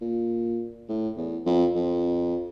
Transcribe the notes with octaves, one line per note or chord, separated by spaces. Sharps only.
A#2
A2
E2
F2
F2